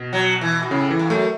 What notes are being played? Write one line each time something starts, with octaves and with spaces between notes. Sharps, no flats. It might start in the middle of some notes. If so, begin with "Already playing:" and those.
Already playing: B2
F#3
E3
B2
A2 C#3
E3
G2
F#2 A3